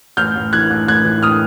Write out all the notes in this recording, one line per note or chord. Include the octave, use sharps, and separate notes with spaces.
A1 F6 G6
A1
E3 F#6 G#6
A1
A1 F#6 G#6
E3
A2 D#6 F6